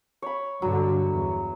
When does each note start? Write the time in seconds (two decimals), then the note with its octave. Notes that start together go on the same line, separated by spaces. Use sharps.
0.22 C#5 B5
0.62 G2 D3 F#3
1.09 E2